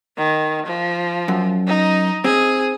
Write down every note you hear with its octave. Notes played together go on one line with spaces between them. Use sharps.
D#3
F3
F#2
D#4
C4 G#4